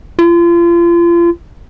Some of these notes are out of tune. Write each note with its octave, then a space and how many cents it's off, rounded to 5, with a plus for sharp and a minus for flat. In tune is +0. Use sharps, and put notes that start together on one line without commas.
F4 -35